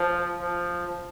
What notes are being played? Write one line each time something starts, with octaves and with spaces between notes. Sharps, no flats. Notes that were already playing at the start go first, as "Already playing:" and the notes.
Already playing: F3
F3